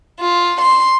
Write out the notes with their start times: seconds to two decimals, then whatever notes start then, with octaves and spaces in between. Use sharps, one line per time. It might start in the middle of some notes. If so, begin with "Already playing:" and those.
0.21 F4
0.61 C6